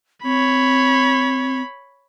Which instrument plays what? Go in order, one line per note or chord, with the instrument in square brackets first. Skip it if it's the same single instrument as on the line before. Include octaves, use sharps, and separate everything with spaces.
[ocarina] C4 [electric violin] C#5 B5